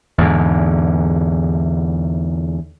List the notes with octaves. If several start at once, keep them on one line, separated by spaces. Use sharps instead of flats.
E2 G#2 D3